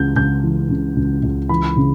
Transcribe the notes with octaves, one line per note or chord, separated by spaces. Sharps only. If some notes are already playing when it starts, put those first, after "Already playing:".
Already playing: C#2 C#3 E3 G6
C#2 G6
E3
C#3
C#2
C#2
E3 B5
C#3